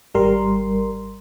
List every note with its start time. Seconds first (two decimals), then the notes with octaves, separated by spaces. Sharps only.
0.14 G#1 G3 A#4 C6